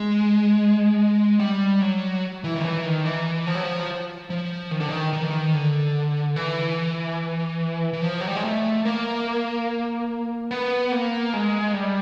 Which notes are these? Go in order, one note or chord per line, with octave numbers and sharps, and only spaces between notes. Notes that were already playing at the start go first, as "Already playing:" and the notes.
Already playing: G#3
G3
F#3
E3
D#3
E3
D#3
E3
F3
F#3
F3
F3
D#3
D3
D#3
D#3
E3
D#3
D3
E3
E3
F3
F#3
G3
G#3
A3
A#3
B3
A#3
G#3
G3